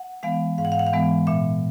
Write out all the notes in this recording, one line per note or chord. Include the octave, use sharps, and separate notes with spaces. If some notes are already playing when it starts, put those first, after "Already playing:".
Already playing: F#5
E3 G#3 B3 F5
G#2 F5
F#5
F5
F#5
F5
E3 G#3 B3
A#2 E5